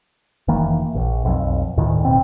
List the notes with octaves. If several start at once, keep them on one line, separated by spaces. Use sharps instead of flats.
F1 D#3 E3 A#3
A#1
B1 F2
D2 A2 D#3
F1 D#2 B2 C4